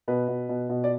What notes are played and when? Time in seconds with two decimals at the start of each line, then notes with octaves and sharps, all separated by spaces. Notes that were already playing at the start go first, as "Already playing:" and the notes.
0.08 B2 B4
0.28 B2
0.49 B2
0.69 B2
0.84 D5